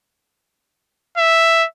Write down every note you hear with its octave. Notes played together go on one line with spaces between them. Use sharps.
E5